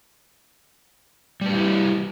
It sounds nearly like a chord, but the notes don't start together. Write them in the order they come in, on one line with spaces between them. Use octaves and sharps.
G3 B4 G4 E4